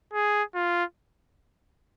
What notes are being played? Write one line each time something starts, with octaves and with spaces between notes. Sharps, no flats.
G#4
F4